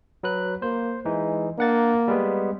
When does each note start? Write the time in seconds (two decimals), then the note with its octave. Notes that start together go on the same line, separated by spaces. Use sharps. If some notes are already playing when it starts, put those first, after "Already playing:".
0.23 F#3 B4 F#6
0.62 A#3 C5
1.05 E3 G#3 D#4
1.58 A#3 D4 F#5 A6
2.08 G3 G#3 B3